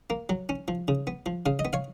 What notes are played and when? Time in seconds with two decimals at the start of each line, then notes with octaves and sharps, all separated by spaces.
0.10 A#3
0.29 F#3
0.49 C#4
0.68 F3
0.88 C#3
1.07 B3
1.26 F3
1.46 C#3 F5
1.59 D#5
1.65 B3
1.73 C#5 F5